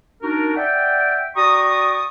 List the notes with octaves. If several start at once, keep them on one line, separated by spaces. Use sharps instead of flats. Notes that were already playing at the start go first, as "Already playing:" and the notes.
D4 D#4 F#4 A#4
D5 E5 F#5 G5
F#4 D5 G5 A#5 C#6 D#6